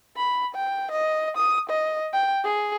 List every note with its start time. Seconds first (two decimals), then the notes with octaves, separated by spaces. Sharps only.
0.16 B5
0.55 G5
0.91 D#5
1.37 D#6
1.70 D#5
2.13 G5
2.44 G#4